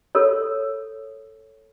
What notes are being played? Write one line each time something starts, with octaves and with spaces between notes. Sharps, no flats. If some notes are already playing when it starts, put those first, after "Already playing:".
A4 A#4 C#5